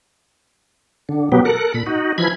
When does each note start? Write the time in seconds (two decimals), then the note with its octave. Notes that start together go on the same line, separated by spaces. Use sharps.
1.09 D3
1.32 B2 F#3 B3 G4
1.45 A4 A#4 F#6
1.74 A#2 B5
1.86 D#4 F#4
2.18 E3 F3 B5 G#6